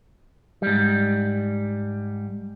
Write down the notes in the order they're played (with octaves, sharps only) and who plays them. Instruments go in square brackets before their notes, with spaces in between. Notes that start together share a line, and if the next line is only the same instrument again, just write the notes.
[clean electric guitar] G#2 G3